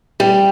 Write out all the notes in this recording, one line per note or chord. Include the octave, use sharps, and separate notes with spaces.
G3